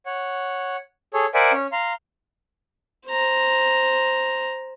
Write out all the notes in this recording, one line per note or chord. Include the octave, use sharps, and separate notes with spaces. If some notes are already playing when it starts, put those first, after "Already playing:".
C#5 F#5
G#4 A4 C#5
A#4 C5 D5 E5 F#5 G#5
C#4
F5 A#5 C6
C5 A#5